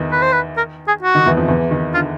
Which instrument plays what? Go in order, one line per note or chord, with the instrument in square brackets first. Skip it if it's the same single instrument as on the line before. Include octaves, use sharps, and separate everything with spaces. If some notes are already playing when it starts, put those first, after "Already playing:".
Already playing: [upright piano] E2 D#3 E3
[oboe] B4
C5
B4
A#4
G#4
F#4
[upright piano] D#3
E2 E3
F2 F3
E2 E3
D#3
[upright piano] D3 [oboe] F4